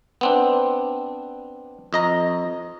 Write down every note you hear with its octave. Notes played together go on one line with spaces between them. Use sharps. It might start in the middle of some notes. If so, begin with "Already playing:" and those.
B3 C4 D4
F2 D#5 A#5